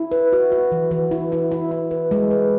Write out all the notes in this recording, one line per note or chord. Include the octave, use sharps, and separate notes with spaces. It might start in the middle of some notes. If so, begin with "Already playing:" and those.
Already playing: E4
B4
F#4
F#4
E3
E3
E4
E4
E4
E4
B4
G#3
B4